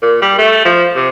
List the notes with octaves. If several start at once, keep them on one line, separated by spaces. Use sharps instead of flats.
A#2
G3
A3
F3
C3